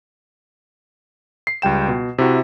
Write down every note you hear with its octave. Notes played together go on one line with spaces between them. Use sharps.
C7
C#2 G3 G5 E7
B2
C3 E4 F#4